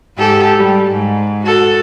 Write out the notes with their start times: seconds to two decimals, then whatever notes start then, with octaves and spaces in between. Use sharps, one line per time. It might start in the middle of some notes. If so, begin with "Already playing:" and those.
0.17 G#2 G4 A4
0.57 G3
0.91 G#2
1.43 F#4 A4